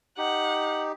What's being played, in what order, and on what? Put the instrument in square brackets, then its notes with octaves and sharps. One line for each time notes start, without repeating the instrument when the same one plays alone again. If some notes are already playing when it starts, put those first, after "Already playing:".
[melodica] D#4 G4 [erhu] F#5